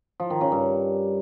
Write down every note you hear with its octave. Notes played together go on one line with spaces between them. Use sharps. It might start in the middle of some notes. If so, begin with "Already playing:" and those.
F3
D#3
C#3
G2